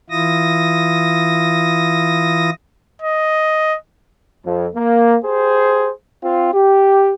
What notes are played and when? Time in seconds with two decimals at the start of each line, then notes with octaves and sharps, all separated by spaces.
0.10 E3 E4 F4 D#6 A#6
3.02 D#5
4.45 F2
4.76 A#3
5.24 G4 G#4 C5
6.23 C4 F4
6.54 G4